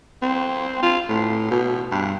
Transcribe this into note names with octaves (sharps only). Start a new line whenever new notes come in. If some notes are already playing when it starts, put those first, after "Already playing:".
C4
F4
A2
B2
G2